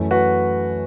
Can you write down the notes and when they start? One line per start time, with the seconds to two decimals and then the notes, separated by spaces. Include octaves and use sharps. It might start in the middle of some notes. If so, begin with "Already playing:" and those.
Already playing: F#2 E3 A3
0.11 F#4 B4